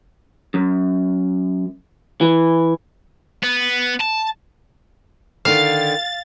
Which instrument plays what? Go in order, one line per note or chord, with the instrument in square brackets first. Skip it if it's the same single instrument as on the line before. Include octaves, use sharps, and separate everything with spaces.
[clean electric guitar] F#2
E3
[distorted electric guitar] B3
A5
[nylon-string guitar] D3 D#3 [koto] F5 [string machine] A6